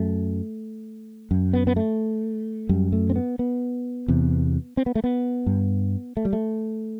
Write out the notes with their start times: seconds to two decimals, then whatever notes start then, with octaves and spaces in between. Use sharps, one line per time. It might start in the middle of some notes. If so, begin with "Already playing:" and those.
Already playing: F#2 A3
1.31 F#2
1.53 B3
1.67 B3
1.76 A3
2.69 F#2 G3
2.92 A3
3.10 C4
3.16 B3
3.39 B3
4.08 E2 C3
4.77 C4
4.86 B3
4.95 A3
5.04 B3
5.46 G2
6.17 A3
6.25 G3
6.33 A3